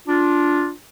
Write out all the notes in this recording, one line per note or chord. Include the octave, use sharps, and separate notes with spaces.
D4 F4